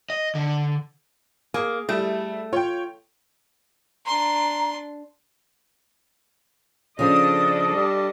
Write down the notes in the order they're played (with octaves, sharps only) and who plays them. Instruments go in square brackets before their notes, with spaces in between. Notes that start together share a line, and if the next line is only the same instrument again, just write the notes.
[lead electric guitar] D#5
D3
[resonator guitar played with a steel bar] A#3 [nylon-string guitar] G#4
[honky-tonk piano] G3 E4 [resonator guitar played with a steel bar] A3
[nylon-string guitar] F4 [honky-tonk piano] C#5 G5
[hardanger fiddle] D4 C6 [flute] A#5
[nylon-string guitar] C#3 F3 [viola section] D4 A4 D#5 [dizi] D#6
[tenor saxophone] G3